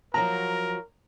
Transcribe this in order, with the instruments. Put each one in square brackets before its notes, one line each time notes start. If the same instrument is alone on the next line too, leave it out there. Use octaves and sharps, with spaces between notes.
[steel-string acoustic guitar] F3 F#3 F#4 [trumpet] A#4 [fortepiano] A#5